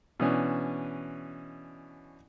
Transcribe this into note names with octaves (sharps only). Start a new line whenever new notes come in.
B2 E3 C#4 D4